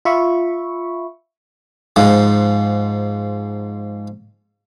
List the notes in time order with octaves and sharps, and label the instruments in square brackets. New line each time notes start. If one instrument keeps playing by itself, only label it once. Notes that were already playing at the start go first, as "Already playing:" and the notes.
[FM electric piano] F4 E5 B5 C#6
[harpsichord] G#2 F3